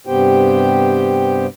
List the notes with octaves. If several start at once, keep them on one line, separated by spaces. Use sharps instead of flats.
G2 C3 B3 G4 C5 G5